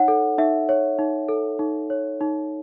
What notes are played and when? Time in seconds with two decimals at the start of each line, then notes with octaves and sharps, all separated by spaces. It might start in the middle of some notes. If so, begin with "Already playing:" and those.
Already playing: D#4 C#5 F#5
0.08 A4
0.38 D#4 E5
0.69 C#5
0.99 D#4
1.29 A4
1.59 D#4
1.90 C#5
2.21 D#4